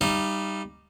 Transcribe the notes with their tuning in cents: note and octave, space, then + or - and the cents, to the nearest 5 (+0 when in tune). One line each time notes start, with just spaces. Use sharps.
G3 +0 D#4 -15 F5 -40